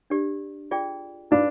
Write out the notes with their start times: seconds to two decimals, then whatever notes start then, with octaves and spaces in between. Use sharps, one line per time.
0.10 D4 G4 D5
0.71 F4 G#4 D5 G5
1.31 D4 D#4 B4 F5 B5